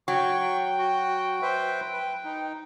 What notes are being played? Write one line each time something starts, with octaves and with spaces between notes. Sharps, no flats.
F#3 G5 C#6
F#4
B4 C5 E5
B4
D#4